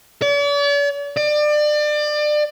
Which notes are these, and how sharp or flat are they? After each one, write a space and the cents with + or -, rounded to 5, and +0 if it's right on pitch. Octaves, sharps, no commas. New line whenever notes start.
D5 -45
D5 +30